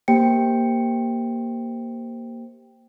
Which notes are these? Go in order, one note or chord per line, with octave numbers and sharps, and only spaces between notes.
A#3 G4 C5 G5 C#7